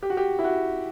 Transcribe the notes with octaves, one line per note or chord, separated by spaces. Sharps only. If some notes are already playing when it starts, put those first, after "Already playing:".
G4
F#4
G4
E4
F#4